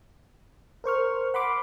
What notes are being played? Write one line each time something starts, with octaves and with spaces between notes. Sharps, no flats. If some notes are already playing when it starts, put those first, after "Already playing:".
A#4 C5 C#6 F6
F#5 B5 C6 D6